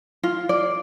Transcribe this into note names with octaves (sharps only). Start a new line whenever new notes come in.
F4
D5